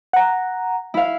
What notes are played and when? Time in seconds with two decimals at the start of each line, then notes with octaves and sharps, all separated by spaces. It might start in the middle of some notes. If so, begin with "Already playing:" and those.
0.13 F#5 A#5
0.94 E4 F5